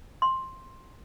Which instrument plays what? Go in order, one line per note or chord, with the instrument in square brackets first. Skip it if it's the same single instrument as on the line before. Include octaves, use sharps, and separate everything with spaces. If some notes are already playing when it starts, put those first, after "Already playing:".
[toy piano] C6